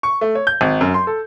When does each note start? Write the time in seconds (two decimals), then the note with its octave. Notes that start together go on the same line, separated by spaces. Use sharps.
0.03 C#6
0.21 A3
0.35 C#5
0.47 G6
0.61 G#1
0.81 F#2
0.94 C6
1.07 A4